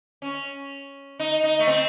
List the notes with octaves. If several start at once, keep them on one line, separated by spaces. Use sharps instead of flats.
C#4
D#4
D#4
A3
C4